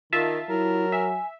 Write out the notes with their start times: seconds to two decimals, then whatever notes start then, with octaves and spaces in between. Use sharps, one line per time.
0.13 D#3 F4 E5 A5
0.49 F#3 E4 A#4
0.92 E5 G#5